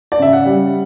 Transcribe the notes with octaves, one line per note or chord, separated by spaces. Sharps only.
D5
C#3 E5
F#5
G3